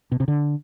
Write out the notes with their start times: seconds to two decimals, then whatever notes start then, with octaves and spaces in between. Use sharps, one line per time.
0.12 B2
0.20 C3
0.28 D3